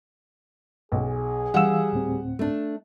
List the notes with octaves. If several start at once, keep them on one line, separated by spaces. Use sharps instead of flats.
B1 G#4
E3 G3 F5 F#5 E6 E7
D2 A2 C4
A3 D4